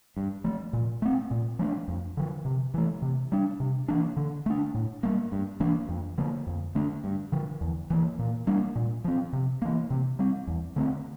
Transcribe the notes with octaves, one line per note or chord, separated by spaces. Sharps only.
G2
F3 A3
A#2
A3 C4
A#2
F3 A3 D4
F2
D3 F3
C3
E3 A3
C3
G3 D4
C3
E3 A#3 D4
D3
A3 D4
A2
G3 A#3
G2
E3 A#3 D4
F2
D3 F3 A#3
F2
D3 A3 D4
G2
D3 F3
E2
E3 A#3
A#2
G3 A#3 D4
A#2
F3 C4
C3
E3 A#3
C3
G3 C4
E2
D3 A3 C4